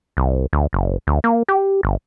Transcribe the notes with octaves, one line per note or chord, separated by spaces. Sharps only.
C2
D2
F#1
D2
A#3
G4
G1